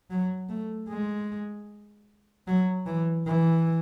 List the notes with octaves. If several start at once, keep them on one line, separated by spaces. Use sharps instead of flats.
F#3
A3
G#3
F#3
E3
E3